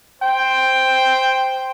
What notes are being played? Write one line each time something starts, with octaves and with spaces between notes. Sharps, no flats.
C5 G5